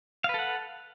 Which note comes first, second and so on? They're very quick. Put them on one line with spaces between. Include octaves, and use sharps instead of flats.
F5 B4 A4 F#5